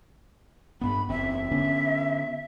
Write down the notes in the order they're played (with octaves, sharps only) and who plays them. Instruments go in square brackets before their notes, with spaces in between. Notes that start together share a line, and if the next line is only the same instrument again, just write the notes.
[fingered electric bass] G2 B3 [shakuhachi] B5
[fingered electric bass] F#1 E2 C4 [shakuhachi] E5
[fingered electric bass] D3 B3 C#4